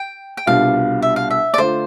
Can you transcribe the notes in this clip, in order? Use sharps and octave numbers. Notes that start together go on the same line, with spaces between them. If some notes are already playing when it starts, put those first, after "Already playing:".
Already playing: G5
G5
C2 B2 G3 D4 F4 F5
E5
F5
E5
D5
D3 A3 D4 F4 C5